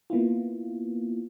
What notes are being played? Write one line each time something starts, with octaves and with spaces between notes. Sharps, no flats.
A#3 B3 E4 F4